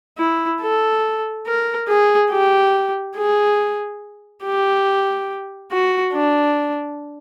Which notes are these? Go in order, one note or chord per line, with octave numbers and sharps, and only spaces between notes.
E4
A4
A#4
G#4
G4
G#4
G4
F#4
D4